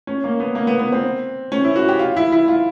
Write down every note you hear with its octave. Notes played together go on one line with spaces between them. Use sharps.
C#4
A#3
B3
A#3
B3
B3
C4
C#4
E4
F#4
G4
F4
E4
E4
F4